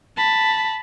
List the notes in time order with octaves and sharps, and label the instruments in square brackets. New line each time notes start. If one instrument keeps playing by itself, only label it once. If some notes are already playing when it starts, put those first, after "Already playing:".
[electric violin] A5 B5